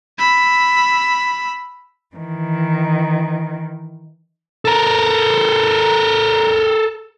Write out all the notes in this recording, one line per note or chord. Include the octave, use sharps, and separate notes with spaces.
B5 E6
D#3 E3
A4 A#4